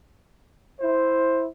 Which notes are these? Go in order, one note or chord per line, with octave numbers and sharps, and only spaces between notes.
E4 C5